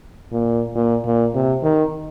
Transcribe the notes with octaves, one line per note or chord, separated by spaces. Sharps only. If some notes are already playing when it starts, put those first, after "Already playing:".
A#2
A#2
A#2
C3
D#3